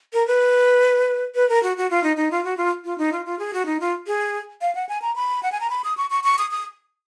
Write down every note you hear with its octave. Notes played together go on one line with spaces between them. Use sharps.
A#4
B4
B4
A#4
F#4
F#4
F4
D#4
D#4
F4
F#4
F4
F4
D#4
F4
F4
G#4
F#4
D#4
F4
G#4
F5
F#5
G#5
A#5
B5
F#5
G#5
A#5
B5
D#6
C#6
C#6
C#6
D#6
D#6